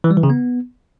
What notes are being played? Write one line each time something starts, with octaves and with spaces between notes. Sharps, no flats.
E3
G3
E3
C#3
B3